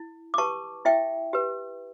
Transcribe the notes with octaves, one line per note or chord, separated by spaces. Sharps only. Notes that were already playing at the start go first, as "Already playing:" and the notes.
Already playing: E4
D6
G4 B4 A5 C#6
E4 E5 G5
G4 B4